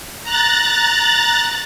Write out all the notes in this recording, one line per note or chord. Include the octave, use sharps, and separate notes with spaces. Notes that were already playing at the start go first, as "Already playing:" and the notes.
A#5 F#6 A6